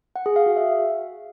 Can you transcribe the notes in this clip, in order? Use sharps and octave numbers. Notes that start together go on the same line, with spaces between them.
F#5
G#4
F5
F#4
E5